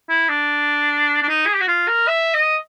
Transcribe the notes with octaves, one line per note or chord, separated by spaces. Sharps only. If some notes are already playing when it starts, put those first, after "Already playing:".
E4
D4
D4
D#4
G#4
G4
F#4
F4
A#4
E5
D#5